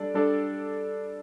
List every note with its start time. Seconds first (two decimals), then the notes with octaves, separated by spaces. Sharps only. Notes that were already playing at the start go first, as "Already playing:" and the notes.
Already playing: G3 D4 A4 D5
0.14 G3 D4 A4 D5